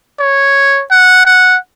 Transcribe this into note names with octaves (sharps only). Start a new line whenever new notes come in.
C#5
F#5
F#5